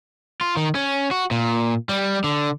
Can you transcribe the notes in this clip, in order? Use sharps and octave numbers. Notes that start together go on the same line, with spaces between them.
F4
D#3
C#4
F#4
A#2
G3
D3